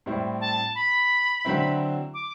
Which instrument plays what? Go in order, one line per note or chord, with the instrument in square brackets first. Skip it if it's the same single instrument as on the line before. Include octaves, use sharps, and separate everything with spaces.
[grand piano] A2 G3 C4 E4
[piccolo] A5
B5
[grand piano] D3 F#3 C4 E4
[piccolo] D6